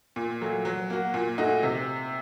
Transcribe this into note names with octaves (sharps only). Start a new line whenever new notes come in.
A#2
F#3 A3
F#3
A#3 F#4
A#2
A3 D#4 F#4
C3